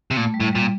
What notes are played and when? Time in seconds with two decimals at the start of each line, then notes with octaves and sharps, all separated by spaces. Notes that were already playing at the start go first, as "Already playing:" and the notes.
0.11 C3
0.17 A#2 A3
0.34 G3
0.40 A2
0.53 A#2 G3